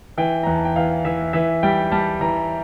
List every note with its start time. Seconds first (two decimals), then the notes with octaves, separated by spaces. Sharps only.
0.18 E3 G5
0.43 E2 A#5
0.55 A5
0.65 G5
0.76 E3 F5
1.05 E3 E5
1.33 E3 E5
1.63 G3 G5
1.91 G3 A5
2.21 E3 A#5